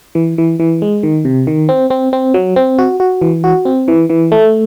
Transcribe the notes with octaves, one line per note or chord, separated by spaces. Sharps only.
E3
E3
E3
G#3
D#3
C3
D#3
C4
C4
C4
F#3
C4
F#4
F#4
E3
F#4
C4
E3
E3
A3